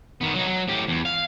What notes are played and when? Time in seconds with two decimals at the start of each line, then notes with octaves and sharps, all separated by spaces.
0.21 D#3 B3
0.35 F#3 D#4
0.47 F#3
0.68 A2 G4
0.88 E2
1.05 F5